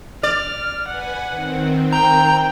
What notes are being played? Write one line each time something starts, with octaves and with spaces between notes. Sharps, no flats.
D5 F6
B4 F#5 G#5
D#3 C4
G5 A#5